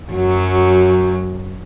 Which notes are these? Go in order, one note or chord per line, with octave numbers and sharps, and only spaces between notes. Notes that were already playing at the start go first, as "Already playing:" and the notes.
F#2 F#3